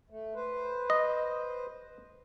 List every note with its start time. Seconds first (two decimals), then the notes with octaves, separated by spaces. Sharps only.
0.10 A3
0.35 B4 C5
0.90 D#5